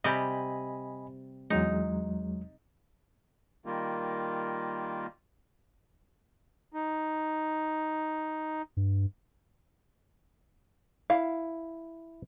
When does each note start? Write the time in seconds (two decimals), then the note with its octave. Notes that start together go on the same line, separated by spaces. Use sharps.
0.04 C3 G3 C4 D#5 G#5 B5
1.50 E2 F#3 G#3 D#4
3.66 D#3 G3 A#3 F4
6.73 D#4
8.77 G2
11.10 E4 F5